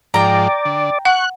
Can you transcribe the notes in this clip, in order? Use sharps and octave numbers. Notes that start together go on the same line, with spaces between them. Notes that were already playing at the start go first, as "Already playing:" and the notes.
G#2 F3 D5 G5 A#5
D3
F#5 C#6 F#6